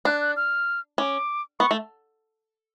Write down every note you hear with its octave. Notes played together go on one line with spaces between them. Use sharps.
D4 F#6
F#6
F6
C#4 D6
B3 C#6
A3